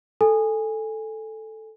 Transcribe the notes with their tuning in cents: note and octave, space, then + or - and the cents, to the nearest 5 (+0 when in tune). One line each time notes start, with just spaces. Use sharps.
A4 +0 G#5 -10